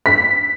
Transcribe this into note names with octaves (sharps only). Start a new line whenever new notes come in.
B6